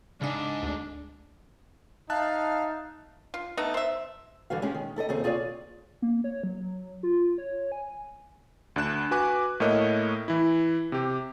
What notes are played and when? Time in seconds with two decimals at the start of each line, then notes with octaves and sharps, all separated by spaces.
0.21 G#2 C#3 D4 G#4
0.62 D2
2.10 D#4 E5 F5 A5 F#6
3.34 F4
3.57 A3 B3 D#4
3.74 C5 E5
4.50 G2 D3 E3 F#4 F5
4.62 G#3 C#4 G4 G#4
4.74 D#3
4.96 E4 A4 C5 D#5
5.09 D#2 C#3 C4 G#4
5.24 F4 G#4 A#4 C#5 D5
6.02 A#3
6.24 C#5
6.43 F#3
7.03 F4
7.38 C#5
7.72 G#5
8.76 D2 D4 F#6 E7
9.11 F#4 B4 G#5 D6 F#6
9.60 A2 A3 A#3 A#4 C#5 D#5
10.28 E3 E4
10.92 C3 G4